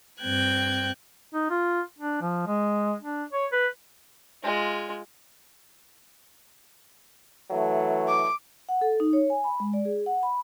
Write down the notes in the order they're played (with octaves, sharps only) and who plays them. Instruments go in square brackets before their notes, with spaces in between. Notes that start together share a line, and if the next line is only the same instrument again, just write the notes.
[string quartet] G2 C4 G5 F#6 G#6
[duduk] D#4
F4
D4
F3
G#3
D4
C#5
B4
[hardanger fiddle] G#3 F4
[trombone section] E3 F#3 A3
[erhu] D6
[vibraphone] F#5
A4
D#4
C#5
G#5
B5
G#3
D5
G#4
F#5
B5